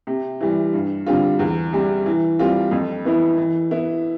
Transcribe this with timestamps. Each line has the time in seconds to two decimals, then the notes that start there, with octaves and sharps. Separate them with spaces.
0.07 C3
0.41 E3 G3
0.73 G2
1.06 D3 G3 C4 F4
1.39 E2
1.73 C3 G3
2.06 E3
2.39 G3 C4 F4
2.71 F2
3.05 E3 B3 E4
3.37 E3
3.71 B3 E4